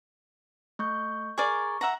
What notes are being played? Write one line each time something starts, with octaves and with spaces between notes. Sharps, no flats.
A3 C#6 G6
G#4 A#4 D5 C#6
E5 F#5 A#5